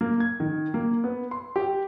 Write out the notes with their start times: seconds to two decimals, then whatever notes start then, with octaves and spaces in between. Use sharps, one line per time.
0.01 A#3
0.20 G#6
0.40 D#3
0.74 A#3
1.04 B3
1.31 C6
1.56 G4